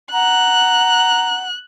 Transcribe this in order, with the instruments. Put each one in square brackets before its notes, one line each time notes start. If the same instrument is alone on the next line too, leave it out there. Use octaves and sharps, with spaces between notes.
[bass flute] F#5 [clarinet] A#5 [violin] F#6